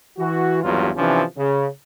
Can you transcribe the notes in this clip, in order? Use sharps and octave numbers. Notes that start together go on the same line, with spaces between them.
E3 F#4
G#1 E2 G2 F#3 F4
C3 E3 F3 C#4 D4
C#3